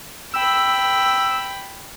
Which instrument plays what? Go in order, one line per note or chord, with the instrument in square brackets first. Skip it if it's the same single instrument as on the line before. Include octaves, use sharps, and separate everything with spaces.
[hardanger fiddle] G5 B5 [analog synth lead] E6